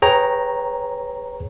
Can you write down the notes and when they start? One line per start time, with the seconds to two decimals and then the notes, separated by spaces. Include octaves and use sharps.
0.02 G#4 B4 C#5 G5 A#5